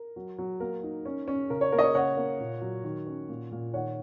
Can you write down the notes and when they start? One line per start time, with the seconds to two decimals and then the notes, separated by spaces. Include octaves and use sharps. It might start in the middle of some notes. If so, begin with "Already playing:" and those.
Already playing: A#4
0.16 F#3
0.38 F#3
0.60 A#3 A#4
0.83 D#4
1.05 C#4
1.28 C#4
1.50 C#3 A#4
1.61 C#5
1.72 A#3 A#4
1.78 D#5
1.84 C#5
1.94 C#3 C#5 F#5
2.17 A#3
2.40 A#2
2.61 F#3
2.84 D#3
3.07 C#4
3.29 A#2
3.52 A#2
3.74 D#3 C#5 F#5